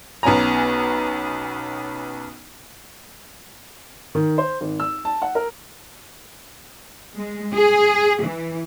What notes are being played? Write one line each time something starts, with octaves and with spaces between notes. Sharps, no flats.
B1 B3 C#4 G#5 A#5
D#3
C5
G#1
E6
A5
F#5
A#4
G#3
G#4
E3